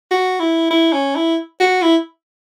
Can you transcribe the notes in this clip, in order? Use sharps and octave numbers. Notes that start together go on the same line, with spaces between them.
F#4
E4
E4
C#4
E4
F#4
E4